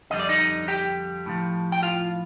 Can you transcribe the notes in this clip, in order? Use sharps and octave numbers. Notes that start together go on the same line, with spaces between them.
F2 D3 G3 D#5
D5
D#4 D#5
G4 G5
A2 F3
G5
F4 F5